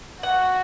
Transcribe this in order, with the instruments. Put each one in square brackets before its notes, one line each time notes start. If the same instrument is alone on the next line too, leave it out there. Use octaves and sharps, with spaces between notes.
[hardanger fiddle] F#4 [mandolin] F#5